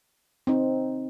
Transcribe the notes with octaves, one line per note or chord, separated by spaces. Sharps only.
C4 D#4